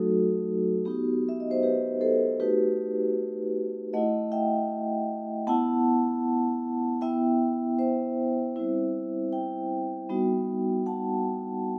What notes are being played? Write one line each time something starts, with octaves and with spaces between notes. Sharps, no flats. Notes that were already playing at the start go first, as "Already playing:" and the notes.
Already playing: F#3 A3 D#4 F#4 A4
B3 D#4 F#4 G4
E5
D#5
C5
G4 B4
A4 C5
A3 D#4 F#4 G4 B4
A3 E4 D#5 F#5
E5 G5
B3 E4 F#5 A5
B3 E4 E5 G5
C5 E5
G3 C4 E4
E5 G5
G3 B3 D#4 F#4
F#5 A5